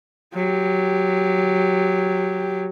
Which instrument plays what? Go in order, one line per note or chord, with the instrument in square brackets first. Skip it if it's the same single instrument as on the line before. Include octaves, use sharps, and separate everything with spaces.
[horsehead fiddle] F#3 G4